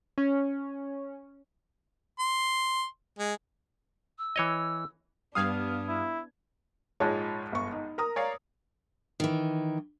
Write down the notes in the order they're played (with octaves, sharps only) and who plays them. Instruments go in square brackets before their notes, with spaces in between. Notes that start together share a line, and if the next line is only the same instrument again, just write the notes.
[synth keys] C#4
[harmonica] C6
G#3
[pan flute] E6
[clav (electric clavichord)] E3 C#5 D#5
[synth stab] G2 G3 F5 [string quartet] B3 D4 [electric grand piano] D#6 F6 G#6
[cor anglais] E4
[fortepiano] A#1 G#2 G#3 [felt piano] F4 C#5 A5
[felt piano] G1 C#6
D#4
A#4 A#5 D#6
[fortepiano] C#5 D5 F5
[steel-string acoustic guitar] D#3 E3